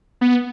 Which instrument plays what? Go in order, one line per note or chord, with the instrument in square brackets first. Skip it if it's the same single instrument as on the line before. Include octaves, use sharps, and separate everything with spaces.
[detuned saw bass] B3